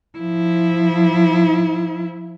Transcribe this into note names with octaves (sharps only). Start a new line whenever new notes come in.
F3 E4